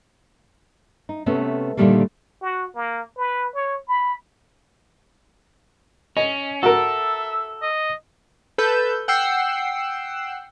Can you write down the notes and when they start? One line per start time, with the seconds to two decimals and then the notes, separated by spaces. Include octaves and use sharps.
1.09 D#4
1.26 C3 A3 B3 C#4
1.77 A#2 D3 D#3 G3 A3 A#3
2.42 F#4
2.75 A#3
3.17 B4
3.55 C#5
3.88 B5
6.17 C#4 D#5
6.63 F#4 A4 A#4 E5
7.62 D#5
8.58 A4 B4 E6 G6
9.08 F#5 G5 E6 C7